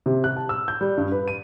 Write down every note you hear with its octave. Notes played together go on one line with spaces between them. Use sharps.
C3
F#6
A5
E6
G6
G3
G2
B4
D#7